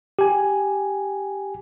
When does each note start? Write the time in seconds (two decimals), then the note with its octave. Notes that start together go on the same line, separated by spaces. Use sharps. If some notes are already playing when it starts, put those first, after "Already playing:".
0.19 G4 G#5